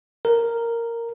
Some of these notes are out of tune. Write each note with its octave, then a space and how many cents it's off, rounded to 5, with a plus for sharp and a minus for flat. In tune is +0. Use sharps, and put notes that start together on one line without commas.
A#4 -5